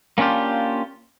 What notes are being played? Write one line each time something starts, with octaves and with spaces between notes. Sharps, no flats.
A#3 C#4 D4 F4 G4